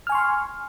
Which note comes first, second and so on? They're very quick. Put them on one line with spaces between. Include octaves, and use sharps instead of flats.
F6 G#5 C#6 C6